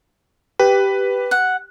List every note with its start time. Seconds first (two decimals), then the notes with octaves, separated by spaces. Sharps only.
0.59 G4 B4
1.31 F#5